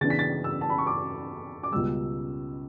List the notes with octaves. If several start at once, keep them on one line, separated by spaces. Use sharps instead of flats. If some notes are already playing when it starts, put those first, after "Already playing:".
C#3 E3 B3 D4 A6
B6
A6
E6
A5
B5
C#6
D6
D6
C#2 B2 G3 E6